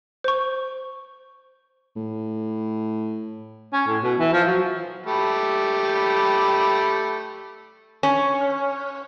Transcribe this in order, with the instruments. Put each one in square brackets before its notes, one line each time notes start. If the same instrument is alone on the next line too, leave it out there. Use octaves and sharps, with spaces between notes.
[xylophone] C5 C#6
[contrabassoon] A2
[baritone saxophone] C#4
A2
B2
E3
F3
F#3
[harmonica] A3 G4 B5
[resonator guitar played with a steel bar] C#4